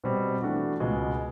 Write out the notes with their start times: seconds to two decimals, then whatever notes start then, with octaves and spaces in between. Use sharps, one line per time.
0.04 B2 G3 C4
0.42 E3 A3 D4 F#4
0.80 C#2 B2 G#3